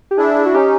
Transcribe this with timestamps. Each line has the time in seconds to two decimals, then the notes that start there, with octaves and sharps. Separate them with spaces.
0.11 G4
0.18 D4 E4 G#4
0.46 F#4
0.55 C#4 D#4 G4